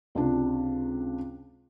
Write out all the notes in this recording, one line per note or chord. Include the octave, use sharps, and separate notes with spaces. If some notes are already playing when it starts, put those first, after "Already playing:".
C#2 C3 D4